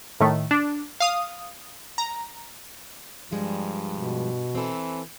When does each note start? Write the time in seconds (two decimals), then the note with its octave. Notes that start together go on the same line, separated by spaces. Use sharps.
0.20 A2 D#3 A3
0.51 D4
1.00 F5 D#6
1.98 A#5
3.31 G2 F3 G3 G#3
3.94 B2
4.55 E3 C4 A4